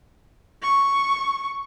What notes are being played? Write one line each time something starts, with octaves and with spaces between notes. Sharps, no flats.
C#6